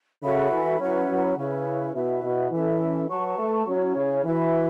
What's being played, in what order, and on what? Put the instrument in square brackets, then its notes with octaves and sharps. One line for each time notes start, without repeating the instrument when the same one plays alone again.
[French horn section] C#3 [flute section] F#4 A4 E5 B5
[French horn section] E3
[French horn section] F#3 [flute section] C#4 E4 B4 F#5
[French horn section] F#3
[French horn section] C#3 [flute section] C#4 E4 B4
[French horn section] B2 [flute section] E4 B4 E5
[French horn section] B2
[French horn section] E3 [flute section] C#4 A4 E5
[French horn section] F#3 [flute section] B4 A5 C#6
[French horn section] A3
[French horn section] F#3 [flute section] C#4 E4 C#5
[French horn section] C#3
[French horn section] E3 [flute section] F#4 B4 E5 B5